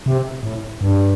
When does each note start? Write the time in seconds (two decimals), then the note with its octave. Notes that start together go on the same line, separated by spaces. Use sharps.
0.06 C3
0.43 A2
0.81 G2